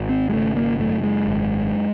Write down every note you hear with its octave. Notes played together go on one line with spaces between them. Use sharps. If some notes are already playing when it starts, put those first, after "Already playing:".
Already playing: G#1
C4
G#3
C#3 A3
A#3
F#2 A3
G#3
G#1